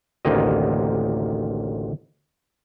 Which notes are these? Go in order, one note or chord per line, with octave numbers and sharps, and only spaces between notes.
A1 D2 C3 D#3 A#3 D#5